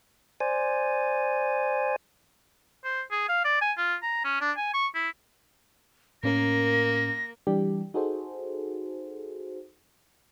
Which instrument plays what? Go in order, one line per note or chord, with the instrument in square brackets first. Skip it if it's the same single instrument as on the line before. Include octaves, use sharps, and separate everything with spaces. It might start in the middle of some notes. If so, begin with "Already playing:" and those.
[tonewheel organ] C5 D5 G#5
[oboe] C5
G#4
F5
D5
G#5
F4
A#5
C#4
D4
G#5
C#6
E4
[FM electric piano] A2 C#4 A#4 [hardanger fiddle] A#3 [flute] A#6
[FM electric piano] E3 G3 D4 G4
D#4 F#4 G#4 A4 C5